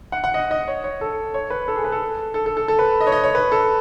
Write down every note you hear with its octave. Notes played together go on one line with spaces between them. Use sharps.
F#5
F#5
D#5
D#5
C#5
C#5
A4
C#5
B4
A4
G#4
B4
A4
A4
A4
A4
A4
B4
D#5
C#5
D#5
C#5
B4
A4